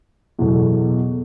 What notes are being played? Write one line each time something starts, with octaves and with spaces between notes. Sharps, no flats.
E2 B2 F#3 A3